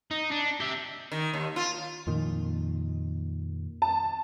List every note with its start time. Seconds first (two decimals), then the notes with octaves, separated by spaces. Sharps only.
0.11 D#4
0.31 D4
0.60 G4 E5
1.12 D#3
1.34 D#2
1.56 F4
2.07 F2 A#2 D#3
3.82 A5